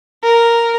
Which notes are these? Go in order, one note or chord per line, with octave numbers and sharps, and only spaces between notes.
A#4